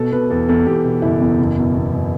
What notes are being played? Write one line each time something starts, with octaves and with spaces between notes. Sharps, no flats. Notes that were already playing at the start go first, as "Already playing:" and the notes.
Already playing: B2 A4
B2 B4
E2 A4
E2 A4
E2 G4
B2
F#1 E4
E2
F#1
B2
E2
F#1